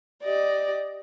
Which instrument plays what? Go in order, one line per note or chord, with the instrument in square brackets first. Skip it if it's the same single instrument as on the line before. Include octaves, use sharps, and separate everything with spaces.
[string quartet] G4 D5 D#5